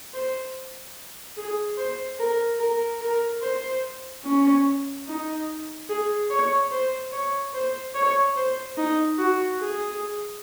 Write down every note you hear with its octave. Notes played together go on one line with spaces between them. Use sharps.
C5
G#4
C5
A#4
A#4
A#4
C5
C#4
D#4
G#4
C#5
C5
C#5
C5
C#5
C5
D#4
F#4
G#4